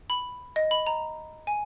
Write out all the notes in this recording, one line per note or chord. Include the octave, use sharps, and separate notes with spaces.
B5
D#5
B5
A#5
G#5